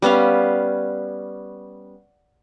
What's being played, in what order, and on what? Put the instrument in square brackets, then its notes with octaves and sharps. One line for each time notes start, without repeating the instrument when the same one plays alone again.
[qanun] G3 B3 C#4 F5